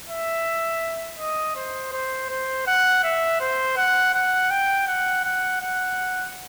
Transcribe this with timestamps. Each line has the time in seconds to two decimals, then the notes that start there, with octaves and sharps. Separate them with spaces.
0.09 E5
1.19 D#5
1.56 C5
1.92 C5
2.29 C5
2.67 F#5
3.03 E5
3.40 C5
3.77 F#5
4.14 F#5
4.51 G5
4.87 F#5
5.24 F#5
5.61 F#5